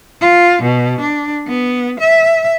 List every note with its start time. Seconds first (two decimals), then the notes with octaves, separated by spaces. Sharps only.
0.21 F4
0.62 B2
1.01 D4
1.47 B3
2.00 E5